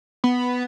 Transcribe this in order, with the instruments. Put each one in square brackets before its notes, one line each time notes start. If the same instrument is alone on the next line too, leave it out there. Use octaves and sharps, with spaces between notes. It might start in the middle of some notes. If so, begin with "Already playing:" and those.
[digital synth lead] B3